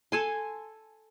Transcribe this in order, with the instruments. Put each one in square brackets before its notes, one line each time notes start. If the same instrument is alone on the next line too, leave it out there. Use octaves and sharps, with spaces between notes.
[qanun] A4 G#5 C6